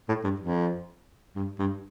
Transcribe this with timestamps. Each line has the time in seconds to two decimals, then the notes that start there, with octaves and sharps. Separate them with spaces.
0.09 A2
0.24 G2
0.40 F2
1.36 G2
1.59 G2